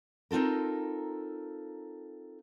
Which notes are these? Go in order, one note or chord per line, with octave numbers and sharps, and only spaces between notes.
C4 D#4 F4 A4 A#4